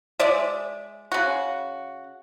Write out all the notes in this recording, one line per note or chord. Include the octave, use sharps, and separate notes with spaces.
G#3 D5 E5
C#3 F#4